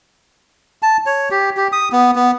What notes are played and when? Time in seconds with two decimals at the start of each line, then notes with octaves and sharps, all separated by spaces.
0.83 A5
1.06 C#5
1.31 G4
1.57 G4
1.72 D#6
1.92 B3
2.16 B3